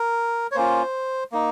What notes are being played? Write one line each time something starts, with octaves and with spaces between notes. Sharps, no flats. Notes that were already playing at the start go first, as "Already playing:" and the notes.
Already playing: A#4
C#5
A#3 C#4 F4 C5
A#3 D#4